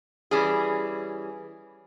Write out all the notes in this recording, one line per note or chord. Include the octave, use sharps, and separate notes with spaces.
E3 G3 C#4 G#4